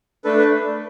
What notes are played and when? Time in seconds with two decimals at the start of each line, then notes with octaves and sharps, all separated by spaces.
0.24 A3 D4 A4 B4
0.38 B4